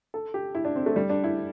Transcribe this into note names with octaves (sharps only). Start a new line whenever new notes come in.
A4
G4
E4
D4
C4
A3
G3
D4
E4